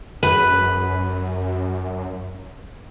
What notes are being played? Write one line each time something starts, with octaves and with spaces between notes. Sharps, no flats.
F#2 B4